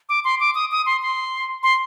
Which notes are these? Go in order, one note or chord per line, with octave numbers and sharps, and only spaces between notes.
D6
C6
D6
D#6
D#6
C6
C6
C6